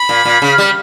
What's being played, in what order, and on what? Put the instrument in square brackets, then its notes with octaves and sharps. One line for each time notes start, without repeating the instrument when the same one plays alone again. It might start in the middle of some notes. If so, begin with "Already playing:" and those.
Already playing: [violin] B5
[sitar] A#2
A#2
C#3
G3